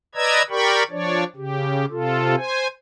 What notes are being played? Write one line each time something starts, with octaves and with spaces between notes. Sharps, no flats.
B4 D5 D#5 A#5 E6 G#6
G4 A#4 D5 G5 B5 C#6
F3 D4 C#5 D5
C#3 G4
C3 F4 A4
C5 G#5